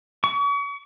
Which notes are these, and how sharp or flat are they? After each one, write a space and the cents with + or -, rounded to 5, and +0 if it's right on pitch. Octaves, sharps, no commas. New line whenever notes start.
C#6 +40